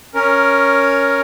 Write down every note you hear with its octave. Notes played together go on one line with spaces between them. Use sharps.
C#4 A#4